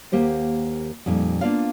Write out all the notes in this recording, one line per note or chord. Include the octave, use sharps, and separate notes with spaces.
D#2 A#3 G4 C5 F#5
F2 A#2 G3 D#4
A#3 B3 D4 F4 D5 F5